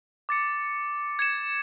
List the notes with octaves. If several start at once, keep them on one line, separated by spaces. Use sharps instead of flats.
D6 A6 C#7
G#6 C#7 E7